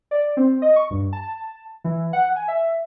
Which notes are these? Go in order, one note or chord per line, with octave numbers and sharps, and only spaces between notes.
D5
C4
D#5
C#6
G2
A5
E3
F#5
G#5
E5